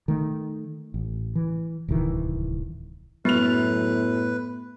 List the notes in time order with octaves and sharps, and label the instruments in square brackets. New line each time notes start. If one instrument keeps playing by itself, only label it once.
[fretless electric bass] D#3 A3
A1
E3
D1 C2 D#3 E3
[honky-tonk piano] F#2 F7 [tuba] A2 [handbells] B3 [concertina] B4